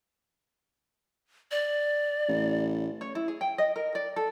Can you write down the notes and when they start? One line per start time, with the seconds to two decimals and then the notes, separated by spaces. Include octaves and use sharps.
1.51 D5
2.29 A1
3.01 C#5
3.15 E4
3.28 G#4
3.41 G5
3.58 D#5
3.76 A#4
3.95 D5
4.16 A4